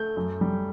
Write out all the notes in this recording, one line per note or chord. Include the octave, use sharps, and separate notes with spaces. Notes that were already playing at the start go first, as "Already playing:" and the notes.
Already playing: A3 G6
F#2
G3